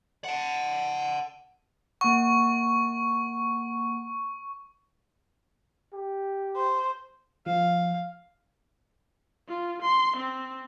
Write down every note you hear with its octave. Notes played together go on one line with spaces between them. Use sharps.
F#5 A5
A#3 F#5 C#6
G4
C5
F3 F5
F4
C6
C4